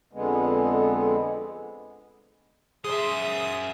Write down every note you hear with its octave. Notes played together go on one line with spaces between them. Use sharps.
F2 D3 G#3 B3
F#2 G#4 C5 E5 C6 D#6